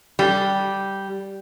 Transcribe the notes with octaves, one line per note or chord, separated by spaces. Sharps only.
G3